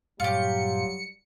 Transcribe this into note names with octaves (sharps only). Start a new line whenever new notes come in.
G2 A#2 F#3 G3 F4 G4 C#7